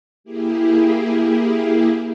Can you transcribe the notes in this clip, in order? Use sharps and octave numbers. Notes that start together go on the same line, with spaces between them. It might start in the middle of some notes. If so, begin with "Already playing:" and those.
A#3 E4 G4 G#4